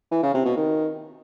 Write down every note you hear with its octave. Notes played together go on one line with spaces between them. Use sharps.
E3
C#3
C3
B2
D#3